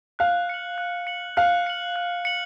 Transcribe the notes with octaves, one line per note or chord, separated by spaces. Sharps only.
F5 F#6
C#7 F#7
F#6
C#7 F#7
F5 F#6
C#7 F#7
F#6
C#7 F#7